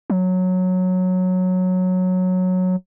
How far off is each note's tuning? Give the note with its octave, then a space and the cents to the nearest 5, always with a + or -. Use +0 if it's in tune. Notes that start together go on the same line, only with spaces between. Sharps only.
F#3 -10